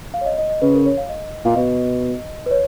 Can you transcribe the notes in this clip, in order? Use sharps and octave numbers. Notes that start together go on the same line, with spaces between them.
F5
C#5
D#5
D#5
D#5
C#3 B4
A#4
C#5
F5
D#5
A#2 F5
B2 D#5
B4
C#5